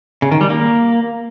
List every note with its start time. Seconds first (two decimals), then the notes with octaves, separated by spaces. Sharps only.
0.22 C#3
0.32 D#3
0.41 G3
0.50 A#3